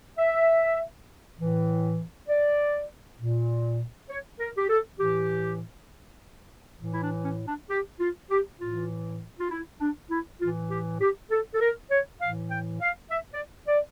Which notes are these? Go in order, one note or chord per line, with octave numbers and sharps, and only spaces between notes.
E5
A2 E3
D5
A#2
C#5
A#4
G4
A4
A2 E3 G4
A2 E3
E4
D4
C#4
D4
G4
F4
G4
A2 E3 F4
F4
E4
D4
E4
A2 E3 F4
G4
G4
A4
A4
A#4
C#5
A2 E3 F5
G5
F5
E5
D5
D5